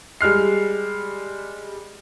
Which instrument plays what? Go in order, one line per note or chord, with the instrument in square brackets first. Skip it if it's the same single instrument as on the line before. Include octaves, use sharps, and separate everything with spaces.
[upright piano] G3 G#3 F6 C7